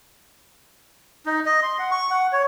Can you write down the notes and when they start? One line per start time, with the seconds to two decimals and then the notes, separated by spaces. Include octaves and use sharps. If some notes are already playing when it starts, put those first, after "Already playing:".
1.26 D#4
1.46 D#5
1.63 C6
1.79 F#5
1.91 C#6
2.11 F#5
2.33 C#5